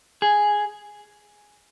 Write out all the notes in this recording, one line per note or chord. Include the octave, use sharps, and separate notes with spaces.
G#4